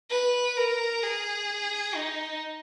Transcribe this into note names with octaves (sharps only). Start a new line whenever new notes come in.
B4
A#4
G#4
D#4